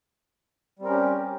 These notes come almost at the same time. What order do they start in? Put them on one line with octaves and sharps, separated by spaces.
G3 C4 A#4 C#4 G4